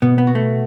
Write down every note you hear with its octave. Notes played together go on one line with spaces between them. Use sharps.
B2 B3
B3
F#4
A3